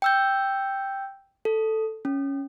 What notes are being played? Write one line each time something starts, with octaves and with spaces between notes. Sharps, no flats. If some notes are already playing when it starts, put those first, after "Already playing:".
G5 E6 G6
A4
C#4